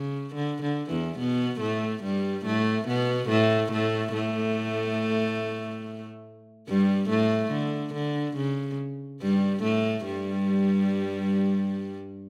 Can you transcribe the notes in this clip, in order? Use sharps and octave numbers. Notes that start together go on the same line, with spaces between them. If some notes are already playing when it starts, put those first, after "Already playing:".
Already playing: C#3
D3
D3
E2 E3
B2 B3
A2 A3
G2 G3
A2 A3
B2 B3
A2 A3
A2 A3
A2 A3
G2 G3
A2 A3
D3
D3
C#3
G2 G3
A2 A3
G2 G3